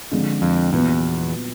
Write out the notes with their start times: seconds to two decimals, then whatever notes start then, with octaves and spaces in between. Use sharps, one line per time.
0.11 D3 F3 G#3 C4 F4
0.42 F2
0.72 E2 A#2 F#3 B3